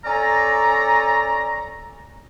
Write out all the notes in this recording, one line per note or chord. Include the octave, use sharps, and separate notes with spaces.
C#4 A4 D5 A#5